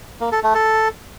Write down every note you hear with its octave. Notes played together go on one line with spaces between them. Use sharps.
A#3
A4
A3
A4